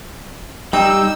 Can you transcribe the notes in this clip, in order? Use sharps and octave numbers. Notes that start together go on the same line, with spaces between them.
G3 D#4 G5 E6